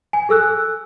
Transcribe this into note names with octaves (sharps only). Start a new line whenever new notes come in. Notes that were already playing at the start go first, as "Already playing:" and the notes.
G#5
G#4 A4 E6 F#6